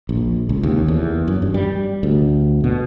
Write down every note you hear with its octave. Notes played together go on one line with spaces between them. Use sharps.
A#1
C#2
D#2
E2
F#2
G2
G3
D2
B2